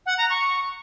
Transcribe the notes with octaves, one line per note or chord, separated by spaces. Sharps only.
F#5
A#5
C#6